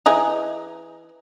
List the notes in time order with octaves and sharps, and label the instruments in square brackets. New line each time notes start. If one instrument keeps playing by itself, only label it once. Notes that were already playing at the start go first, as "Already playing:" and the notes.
[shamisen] E3 D#4 G#4